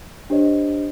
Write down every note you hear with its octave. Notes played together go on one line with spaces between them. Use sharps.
D4 G4 C5 C#5 D#5